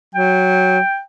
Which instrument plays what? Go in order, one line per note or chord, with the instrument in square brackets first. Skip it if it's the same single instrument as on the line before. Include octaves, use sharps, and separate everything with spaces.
[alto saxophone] F#3 [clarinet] G5